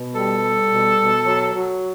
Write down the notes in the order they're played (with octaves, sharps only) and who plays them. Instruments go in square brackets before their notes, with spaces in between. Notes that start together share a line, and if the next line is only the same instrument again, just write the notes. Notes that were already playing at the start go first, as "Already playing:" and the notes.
Already playing: [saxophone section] B2
G3 A4
G3
B2
B2
F#3
F#3